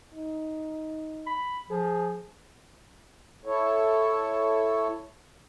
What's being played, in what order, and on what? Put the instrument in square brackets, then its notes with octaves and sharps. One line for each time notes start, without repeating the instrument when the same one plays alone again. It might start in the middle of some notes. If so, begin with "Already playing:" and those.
[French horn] D#4
[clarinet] B5
[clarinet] F3 [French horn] G#4
[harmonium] E4 A4 C#5